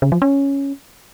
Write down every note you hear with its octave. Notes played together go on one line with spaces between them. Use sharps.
C#3
F3
C#4